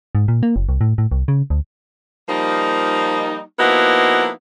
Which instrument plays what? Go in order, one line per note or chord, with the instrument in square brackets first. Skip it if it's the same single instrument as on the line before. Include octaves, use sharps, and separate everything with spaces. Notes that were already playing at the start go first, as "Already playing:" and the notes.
[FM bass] G#2
A#2
A#3
F#1
C2
A2
A2
C2
C#3
D2
[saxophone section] F3 G3 A#3 D#4
F3 A#3 B3 D#4 E4 F#4